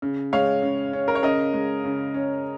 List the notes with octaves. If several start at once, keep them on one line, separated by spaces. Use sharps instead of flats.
C#3
G#3 C#5 F5
C#3
C#4
A#4
C#5
C#3 A#4 D#5
G#3
C#3
C#4